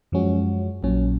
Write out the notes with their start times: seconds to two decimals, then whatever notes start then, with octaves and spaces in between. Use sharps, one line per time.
0.12 F#2 F3 G#3 C#4 F#4
0.83 A#1 A#2 F#3 C#4